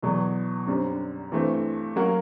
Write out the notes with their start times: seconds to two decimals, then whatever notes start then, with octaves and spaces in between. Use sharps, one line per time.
0.02 E2 B2 F#3
0.67 F#2 D3 G3 C4
1.32 G2 E3 A3 C4
1.96 F#3 A#3 C#4 F#4 A#4